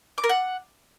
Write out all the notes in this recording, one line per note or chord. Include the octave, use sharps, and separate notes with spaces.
D6
A#4
F#5